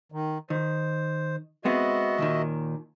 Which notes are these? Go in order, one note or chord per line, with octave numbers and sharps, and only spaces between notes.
D#3
D#3 C5
G#3 B3 C4 F#4 D#5 E5
D#2 A#2 D#3